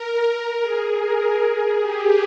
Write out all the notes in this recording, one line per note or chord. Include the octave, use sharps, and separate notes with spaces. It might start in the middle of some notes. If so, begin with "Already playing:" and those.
Already playing: A#4
A#4
G#4
A#4
G#4
G4